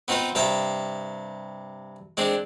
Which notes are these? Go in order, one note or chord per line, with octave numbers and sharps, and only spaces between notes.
B3 C4 D#4 F4 C5
G2 C3 F5 G5 A5
G#3 C4 D4